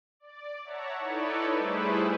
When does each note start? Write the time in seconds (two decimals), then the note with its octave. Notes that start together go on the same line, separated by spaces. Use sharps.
0.20 D5
0.63 C#5 E5 F#5 A5 A#5
1.00 D#4 E4 A4 B4 C#5 D5
1.57 G3 A3 E4 G#4 B4 C5